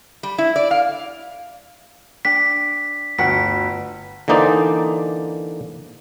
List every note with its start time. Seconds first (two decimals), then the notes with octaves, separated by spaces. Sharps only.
0.23 G3
0.38 E4
0.56 D5
0.71 F5
2.25 D4 G5 B6
3.18 G1 D2 F#4 F#5 G5 B6
4.28 D3 E3 A#3 D#4 C5 D5